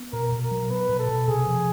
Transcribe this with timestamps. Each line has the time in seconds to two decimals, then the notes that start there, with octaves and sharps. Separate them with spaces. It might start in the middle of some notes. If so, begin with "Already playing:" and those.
Already playing: B3
0.13 B2 A#4
0.32 B2
0.41 A#4
0.51 F#3
0.70 B3 B4
0.89 B2
0.99 A4
1.09 B2
1.28 C3 G#4
1.46 F3